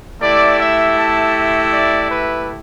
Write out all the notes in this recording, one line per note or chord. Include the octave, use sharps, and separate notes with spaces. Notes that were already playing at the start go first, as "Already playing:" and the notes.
A3 E4 G4 D5
E5
A5
D5
B4